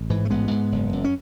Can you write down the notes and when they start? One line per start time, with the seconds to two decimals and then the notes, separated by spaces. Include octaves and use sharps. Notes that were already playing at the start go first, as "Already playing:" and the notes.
Already playing: A1
0.10 G#2 E3
0.25 A3
0.30 A1 G#3 B3
0.51 G#2
0.72 F#1
0.93 F#2
1.04 C#4